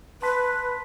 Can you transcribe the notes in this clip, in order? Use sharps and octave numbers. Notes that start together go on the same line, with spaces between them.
B4 A5 C6 F#6 B6